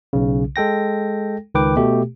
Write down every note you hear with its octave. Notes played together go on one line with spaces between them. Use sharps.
B1 C#3
G#3 A4 G5 A#6
C#2 D#3 B4 G5 D6
B2 A3 G4